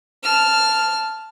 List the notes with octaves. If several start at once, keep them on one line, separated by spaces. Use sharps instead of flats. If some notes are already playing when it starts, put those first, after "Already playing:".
A5 F6